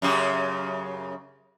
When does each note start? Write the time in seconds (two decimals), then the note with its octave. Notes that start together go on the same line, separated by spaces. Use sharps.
0.02 F#2 C#3 G4